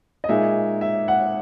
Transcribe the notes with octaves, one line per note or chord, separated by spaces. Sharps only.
D#5
A#2 G#3 D#4 E5
E5
F#5